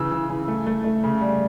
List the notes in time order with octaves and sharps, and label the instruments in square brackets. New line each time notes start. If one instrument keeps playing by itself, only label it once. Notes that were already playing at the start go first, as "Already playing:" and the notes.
Already playing: [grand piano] C#3 E3 E6
E3
C#3
A3
A3
A3
C#3
G3